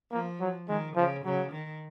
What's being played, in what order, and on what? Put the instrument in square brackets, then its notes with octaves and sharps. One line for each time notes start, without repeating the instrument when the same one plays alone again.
[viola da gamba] F3 [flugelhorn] A#3
[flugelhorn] F#3
[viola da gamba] D#3 [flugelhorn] G#3
[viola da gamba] C#3 [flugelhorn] F3
[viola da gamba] C#3 [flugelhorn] F#3
[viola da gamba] D#3